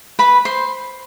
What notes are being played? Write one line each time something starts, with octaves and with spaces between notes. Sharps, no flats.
B4 B5
C5 C6